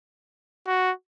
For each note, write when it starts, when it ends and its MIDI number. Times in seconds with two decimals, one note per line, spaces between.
0.67 0.91 66